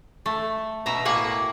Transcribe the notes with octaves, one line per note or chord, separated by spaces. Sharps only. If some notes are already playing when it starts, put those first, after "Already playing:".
A3
B2 E5 A#5
A2 A#3 F#5 G#5